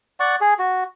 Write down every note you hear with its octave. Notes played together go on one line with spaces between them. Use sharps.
D5 F#5 C#6
G#4
F#4